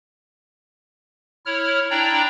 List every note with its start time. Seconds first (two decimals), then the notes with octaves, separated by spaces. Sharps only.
1.46 E4 C#5 F6
1.90 D4 E4 D5 G5 A#5